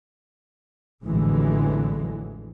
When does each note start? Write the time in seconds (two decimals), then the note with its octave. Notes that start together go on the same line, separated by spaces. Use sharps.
1.06 A1 F2 D3 E3 F#3 G#3